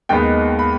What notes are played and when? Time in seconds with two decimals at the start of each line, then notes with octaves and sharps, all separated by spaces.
0.09 D#2 D#3 G#3 B3 D#4 G5
0.59 B5